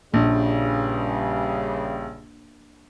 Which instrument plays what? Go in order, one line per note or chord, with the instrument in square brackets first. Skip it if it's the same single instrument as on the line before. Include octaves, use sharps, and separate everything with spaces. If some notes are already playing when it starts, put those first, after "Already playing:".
[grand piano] A#1 [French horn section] G2 C#3 G3 [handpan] A#3 D4